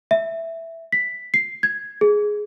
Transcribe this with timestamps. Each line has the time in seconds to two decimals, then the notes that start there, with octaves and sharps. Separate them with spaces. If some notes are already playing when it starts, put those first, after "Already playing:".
0.11 E5
0.92 B6
1.34 C7
1.63 G#6
2.01 G#4